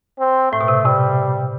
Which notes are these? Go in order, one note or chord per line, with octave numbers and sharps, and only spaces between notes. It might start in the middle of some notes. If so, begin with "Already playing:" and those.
C4
A2 A3
B2
C3
C3 G3